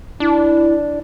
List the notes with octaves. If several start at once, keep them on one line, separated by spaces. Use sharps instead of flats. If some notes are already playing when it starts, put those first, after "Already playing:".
D4 E4